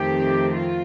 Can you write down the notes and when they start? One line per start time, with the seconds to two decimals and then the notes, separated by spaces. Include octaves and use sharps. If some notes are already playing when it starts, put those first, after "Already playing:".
Already playing: F2 D#3 A3 C4 G4
0.53 F4